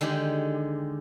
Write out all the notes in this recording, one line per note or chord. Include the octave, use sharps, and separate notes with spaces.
D3 D#3 G#3 G4